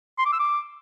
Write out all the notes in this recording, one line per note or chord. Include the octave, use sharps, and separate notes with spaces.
C6
D6
E6
D6